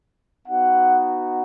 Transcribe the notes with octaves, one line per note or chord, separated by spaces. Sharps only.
B3 D#4 F#4 F#5